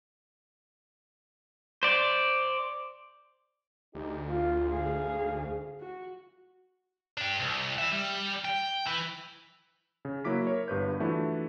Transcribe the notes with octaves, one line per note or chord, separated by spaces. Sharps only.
C5 D5
D2 D#4 G4
F4
G#2 G#4 F5
F#4
D4 G4
C2
B4 E5
G3
G5
E4 B4
C#3
F#3 A#3 E4 D6 B6
A#4 C#5
G1 G2 B4 G6
E3 F3 A3 D4 E4 F#4